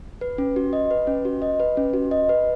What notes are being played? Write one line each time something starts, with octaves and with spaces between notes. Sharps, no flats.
B4
C#4
F#4
D#5
B4
C#4
F#4
D#5
B4
C#4
F#4
D#5
B4